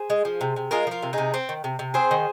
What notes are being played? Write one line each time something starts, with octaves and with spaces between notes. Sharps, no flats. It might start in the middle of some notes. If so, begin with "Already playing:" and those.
Already playing: G#4 C5
G#3
F3
C3
C3
G#3 F4 A#4
F3 F4 A#4
C3
C3 D#4 G#4
C4
D#3
C3
C3
C4 G#4 C5
D#3